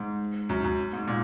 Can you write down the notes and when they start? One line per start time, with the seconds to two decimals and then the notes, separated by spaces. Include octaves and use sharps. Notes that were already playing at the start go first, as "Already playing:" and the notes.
Already playing: G#2
0.49 F#2
0.64 F#2
0.93 G#2
1.07 A#2